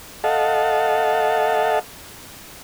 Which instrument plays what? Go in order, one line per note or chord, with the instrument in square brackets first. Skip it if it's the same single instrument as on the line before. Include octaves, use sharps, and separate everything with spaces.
[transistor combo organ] A4 D#5 F5 F#5 A5